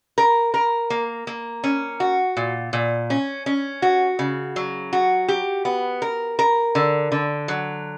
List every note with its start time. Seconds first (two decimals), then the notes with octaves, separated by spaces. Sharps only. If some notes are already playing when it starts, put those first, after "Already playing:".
0.18 A#4
0.54 A#4
0.90 A#3
1.27 A#3
1.64 C#4
2.00 F#4
2.37 A#2
2.73 A#2
3.10 C#4
3.46 C#4
3.82 F#4
4.19 C#3
4.56 F#3
4.93 F#4
5.28 G4
5.65 B3
6.02 A#4
6.39 A#4
6.75 D3
7.12 D3
7.48 F#3